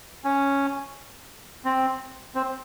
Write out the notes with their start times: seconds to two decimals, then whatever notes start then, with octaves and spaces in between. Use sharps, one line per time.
0.24 C#4
1.65 C4
2.35 C4